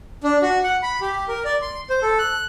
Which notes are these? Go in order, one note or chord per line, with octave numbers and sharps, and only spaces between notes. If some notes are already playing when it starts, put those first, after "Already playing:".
D4
F#4
F#5
B5
G4
A#4
D5
C6
C5
A4
F#6